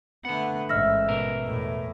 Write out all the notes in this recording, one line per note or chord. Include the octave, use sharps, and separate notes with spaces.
D3 A3 B3 F#5
A1 G#2 D#5 E5 F6 A#6
B2 A#4
E2 A2